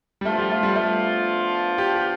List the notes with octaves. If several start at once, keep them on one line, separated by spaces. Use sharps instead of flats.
G3
F3 A3 B3 D4 F4
G3
A3
G3
A3
G4
G4